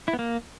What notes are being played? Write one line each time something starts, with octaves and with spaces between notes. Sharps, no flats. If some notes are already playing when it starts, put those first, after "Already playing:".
E4
B3
A#3